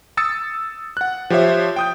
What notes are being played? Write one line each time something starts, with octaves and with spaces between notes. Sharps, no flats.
D#6 E6 A6 C#7
F#5 F#6
F3 G4 C5 C#5 E5
G5 D#6 G6